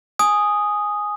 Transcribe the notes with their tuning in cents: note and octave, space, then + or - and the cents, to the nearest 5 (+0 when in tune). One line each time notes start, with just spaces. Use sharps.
G#5 +0 D#6 +0